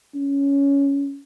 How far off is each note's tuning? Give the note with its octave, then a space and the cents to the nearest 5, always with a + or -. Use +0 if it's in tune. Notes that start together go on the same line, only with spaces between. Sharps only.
C#4 +10